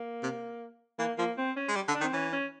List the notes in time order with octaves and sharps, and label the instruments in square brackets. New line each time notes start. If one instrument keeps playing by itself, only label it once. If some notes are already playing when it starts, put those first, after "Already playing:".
Already playing: [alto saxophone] A#3
[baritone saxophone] C3
[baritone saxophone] E3 [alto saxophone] A#3
[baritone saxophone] F3 [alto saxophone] A#3
[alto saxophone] C4
C#4
[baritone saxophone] G#3
G3
D3
[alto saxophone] D4
[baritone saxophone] D#3
[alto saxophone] C4
[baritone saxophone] E3 [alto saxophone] C#4
[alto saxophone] C#4